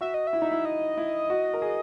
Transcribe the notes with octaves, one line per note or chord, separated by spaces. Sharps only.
F#4 E5
D#5
E5
E4
D#4
E4
D#5
E4
F#4
A#4
G#4